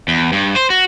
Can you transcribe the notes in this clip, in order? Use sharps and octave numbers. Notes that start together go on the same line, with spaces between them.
E2
G2
C5
F#4